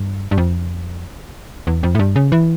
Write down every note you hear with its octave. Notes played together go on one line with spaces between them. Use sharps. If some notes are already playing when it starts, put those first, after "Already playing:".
Already playing: G2
G2
F2
E2
F2
A2
G2
C#3
E3